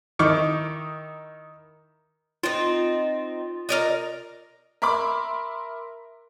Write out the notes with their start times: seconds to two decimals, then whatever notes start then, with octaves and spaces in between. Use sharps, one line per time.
0.19 D#3 D#4 E4 C#6 D6 F6
2.43 C4 D#4 F4
3.69 A#4 D5 D#5
4.82 A#4 E5 B5 C6 D6